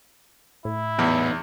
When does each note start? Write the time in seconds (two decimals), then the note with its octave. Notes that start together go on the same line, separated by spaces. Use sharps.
0.65 A2 E4
0.99 E2 B3 D#4